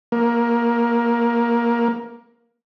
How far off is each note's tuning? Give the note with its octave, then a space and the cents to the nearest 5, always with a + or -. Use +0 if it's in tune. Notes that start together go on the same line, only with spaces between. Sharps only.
A#3 +15